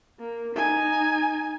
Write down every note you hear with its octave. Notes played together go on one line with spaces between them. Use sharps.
A#3
D#4 G#5